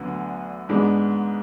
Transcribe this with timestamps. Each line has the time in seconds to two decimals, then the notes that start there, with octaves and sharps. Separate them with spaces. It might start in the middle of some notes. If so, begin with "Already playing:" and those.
Already playing: D2 D3 F#3 B3
0.69 G#2 G#3 B3 D4